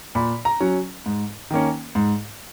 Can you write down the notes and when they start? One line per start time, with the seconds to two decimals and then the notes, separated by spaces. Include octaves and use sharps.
0.15 A#2 B5
0.45 A#5
0.61 F#3 C#4
1.06 G#2
1.50 D#3 A#3 C#4
1.95 G#2